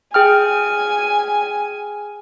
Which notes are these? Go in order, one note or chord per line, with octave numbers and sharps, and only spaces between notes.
G#4 G5 G#5 F6